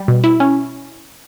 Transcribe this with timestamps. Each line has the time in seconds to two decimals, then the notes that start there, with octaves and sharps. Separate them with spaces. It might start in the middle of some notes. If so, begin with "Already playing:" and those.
Already playing: G3
0.08 B2
0.24 E4
0.40 C#4